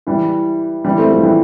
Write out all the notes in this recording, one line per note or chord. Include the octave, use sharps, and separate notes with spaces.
E3 G3
E3 G3
A3 C4
F3 A3
E3 G3